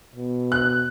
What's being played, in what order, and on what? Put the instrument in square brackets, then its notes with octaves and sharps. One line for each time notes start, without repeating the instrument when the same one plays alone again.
[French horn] B2
[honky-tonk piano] F#6